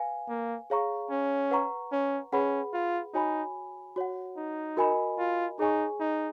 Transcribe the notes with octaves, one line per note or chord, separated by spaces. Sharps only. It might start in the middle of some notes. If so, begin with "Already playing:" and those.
Already playing: B4 F5 G#5
A#3
G#4 C#5 F5 A#5 C#6
C#4
B4 F#5 A#5 C#6
C#4
C#4 G#4 B4 F#5 B5
F4
D#4 F#4 C#5 G#5 B5
F#4 C#5 F#5
D#4
F#4 A#4 D#5 G#5 B5
F4
D#4 G#4 C#5 G#5 C#6
D#4